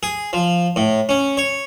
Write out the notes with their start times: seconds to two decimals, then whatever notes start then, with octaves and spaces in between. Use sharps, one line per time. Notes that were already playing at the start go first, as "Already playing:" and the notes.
0.03 G#4
0.33 F3
0.76 A2
1.09 C#4
1.37 C#5